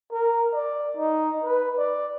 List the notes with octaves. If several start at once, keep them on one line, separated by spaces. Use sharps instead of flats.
A#4
D5
D#4
B4
D5